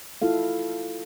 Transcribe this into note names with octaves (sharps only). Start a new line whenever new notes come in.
E4 F4 A4 F5